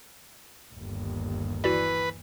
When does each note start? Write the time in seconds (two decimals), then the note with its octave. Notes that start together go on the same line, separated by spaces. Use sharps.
0.73 G1 D#2
1.64 E3 F#4 B4 D5